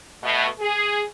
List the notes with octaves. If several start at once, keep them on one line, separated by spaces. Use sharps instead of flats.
B2 A3
G#4